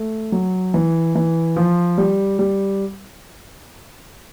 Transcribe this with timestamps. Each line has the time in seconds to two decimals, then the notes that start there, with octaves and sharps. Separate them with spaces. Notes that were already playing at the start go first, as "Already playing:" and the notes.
Already playing: A3
0.32 F#3
0.74 E3
1.15 E3
1.56 F3
1.98 G3
2.39 G3